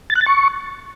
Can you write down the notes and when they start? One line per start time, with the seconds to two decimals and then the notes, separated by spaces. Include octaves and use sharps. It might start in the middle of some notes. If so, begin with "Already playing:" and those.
0.10 A6
0.15 F#6
0.21 A6
0.26 C#6